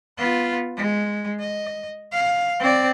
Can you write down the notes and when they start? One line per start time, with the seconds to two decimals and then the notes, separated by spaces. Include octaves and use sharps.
0.18 B3 F4
0.77 G#3
1.40 D#5
2.12 F5
2.60 C4 D5